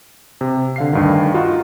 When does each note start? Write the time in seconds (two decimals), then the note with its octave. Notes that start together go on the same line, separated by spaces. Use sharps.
0.41 C3
0.76 D3 F5 C7
0.93 D2 G2 D#3
1.34 D#4 F4 F#4